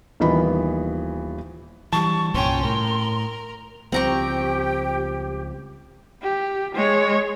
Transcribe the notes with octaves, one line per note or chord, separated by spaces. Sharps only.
D#1 D#3 E3 B3 D#5 B5
E3 F#3 G3 A5 C#6
C2 G2 A#2 C#4 G5 C6
A2 A#4
C#2 F3 G3 C4 G4 G5 A#5 C#6
G4
G#3 C#5